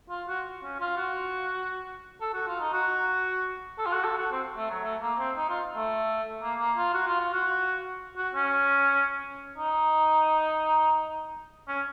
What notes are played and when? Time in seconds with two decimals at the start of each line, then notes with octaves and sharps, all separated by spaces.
0.10 F4
0.28 F#4
0.63 C#4
0.80 F4
0.98 F#4
2.21 A4
2.34 F#4
2.47 F4
2.60 D#4
2.73 F#4
3.78 A4
3.86 F4
3.92 F#4
4.04 A4
4.18 F#4
4.32 C4
4.57 A3
4.70 F#3
4.84 A3
5.01 A#3
5.19 C4
5.37 D#4
5.49 F4
5.76 A3
6.42 A#3
6.59 A#3
6.77 F4
6.94 F#4
7.07 F4
7.20 F4
7.33 F#4
8.17 F#4
8.35 C#4
9.58 D#4
11.68 C#4